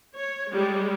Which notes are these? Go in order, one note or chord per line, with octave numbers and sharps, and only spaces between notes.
C#5
G3 G#3